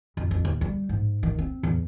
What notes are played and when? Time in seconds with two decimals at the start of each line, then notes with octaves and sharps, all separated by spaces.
0.17 F2
0.31 F2
0.45 D#2
0.61 G3
0.89 G#2
1.23 D#3
1.38 C4
1.63 E2